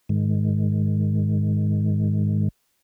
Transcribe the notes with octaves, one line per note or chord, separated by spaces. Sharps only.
G#2 D#3 G#3